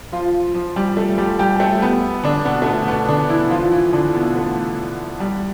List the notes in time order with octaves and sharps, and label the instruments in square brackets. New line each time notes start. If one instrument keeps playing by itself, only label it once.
[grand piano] F3 F4
F3 F4
G3 G4
A3 A4
G3 G4
G3 G4
G4
A3 A4
B3 B4
D3 D4
B2 B3
A3
B2 B3
B2 B3
D3 D4
E3 E4
F3 F4
E3 E4
D3 D4
B2 B3
A3
G3